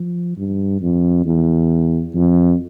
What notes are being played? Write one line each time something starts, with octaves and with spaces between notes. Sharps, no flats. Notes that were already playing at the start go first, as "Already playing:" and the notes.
Already playing: F3
G2
F2
E2
F2